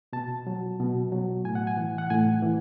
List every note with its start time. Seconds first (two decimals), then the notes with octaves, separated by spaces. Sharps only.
0.13 B2 A5
0.47 F#3
0.79 B2
1.12 F#3
1.44 A2 G#5
1.55 F#5
1.67 G#5
1.77 E3
1.98 F#5
2.10 A2 G#5
2.42 E3